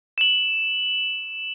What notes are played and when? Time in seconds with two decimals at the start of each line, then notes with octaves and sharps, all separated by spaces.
0.18 E7 F#7